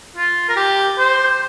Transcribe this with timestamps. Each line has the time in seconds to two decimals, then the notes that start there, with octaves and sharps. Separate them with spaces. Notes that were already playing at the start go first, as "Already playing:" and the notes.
0.16 F4
0.49 A#4
0.57 G4
0.98 C5